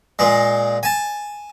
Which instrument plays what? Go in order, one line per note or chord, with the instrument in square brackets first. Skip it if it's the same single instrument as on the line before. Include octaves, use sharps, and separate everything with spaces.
[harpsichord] A#2 G#3
G#5 A5